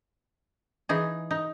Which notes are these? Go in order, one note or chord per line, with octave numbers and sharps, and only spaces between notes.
E3 D#4 G#4
D#4